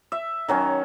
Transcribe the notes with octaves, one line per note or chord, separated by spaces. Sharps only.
E5
D#3 F#3 C#4